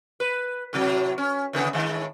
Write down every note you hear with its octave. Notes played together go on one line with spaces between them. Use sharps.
B4
A2 C3 F#3
C#4
E2 C#3 B3
A2 D#3 G#3